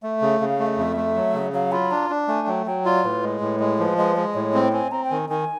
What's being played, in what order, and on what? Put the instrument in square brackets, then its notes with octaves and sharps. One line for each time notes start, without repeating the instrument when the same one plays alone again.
[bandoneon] A3 [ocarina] E5
[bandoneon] C#3
[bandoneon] C#3 [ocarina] F5
[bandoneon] A3
[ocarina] D#5
[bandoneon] F2 [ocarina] E5
[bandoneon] A3
F#3
C#3
[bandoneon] F#3 [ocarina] F5
[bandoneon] F4 [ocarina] B5
[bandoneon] D4 [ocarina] A#5
[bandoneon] D4
[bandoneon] A3 [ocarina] G#5
[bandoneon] F#3 [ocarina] G5
[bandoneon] F#3 [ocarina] G5
[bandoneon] F4 [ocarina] D5
[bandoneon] A2 [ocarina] B4
[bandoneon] G#3
A2
G#3
[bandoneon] F3 [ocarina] B4
[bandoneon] G#3 [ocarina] B4
[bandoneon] G#3 [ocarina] D#5
[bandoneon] A2 [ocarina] C#5
[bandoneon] C4 [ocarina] G5
[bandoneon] C4 [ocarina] G#5
[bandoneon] C4 [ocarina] A#5
[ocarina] G5
[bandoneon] D#3 [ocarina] G#5
[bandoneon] D#3 [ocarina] G#5